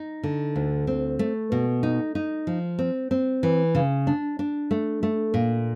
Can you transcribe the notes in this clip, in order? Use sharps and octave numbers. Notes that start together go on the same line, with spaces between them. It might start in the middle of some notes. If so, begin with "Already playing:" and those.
Already playing: D#4
D3
D2
C4
A3
B2
D#4
D#4
F3
C4
C4
E3
C#3
D4
D4
A3
A3
A#2